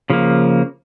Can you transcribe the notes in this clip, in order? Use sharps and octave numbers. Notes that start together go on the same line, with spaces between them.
C#3 F3 A#3